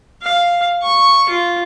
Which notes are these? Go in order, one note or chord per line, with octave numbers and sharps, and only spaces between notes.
F5
C#6
F4